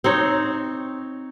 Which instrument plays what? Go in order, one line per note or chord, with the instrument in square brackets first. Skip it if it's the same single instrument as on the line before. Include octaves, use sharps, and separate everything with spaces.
[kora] C4 D#4 C#5